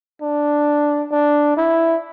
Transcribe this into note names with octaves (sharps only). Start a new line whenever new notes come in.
D4
D4
E4